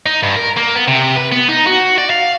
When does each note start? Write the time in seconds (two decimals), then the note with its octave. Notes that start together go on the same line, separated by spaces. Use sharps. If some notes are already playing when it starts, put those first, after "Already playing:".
0.06 D#4
0.23 G2
0.36 A#4
0.57 A#3
0.75 B3
0.88 C3
1.16 B4
1.32 B3
1.49 D#4
1.67 F#4
1.98 D5
2.10 F5